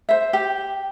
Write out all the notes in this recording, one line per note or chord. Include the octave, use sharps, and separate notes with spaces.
C5 E5
G4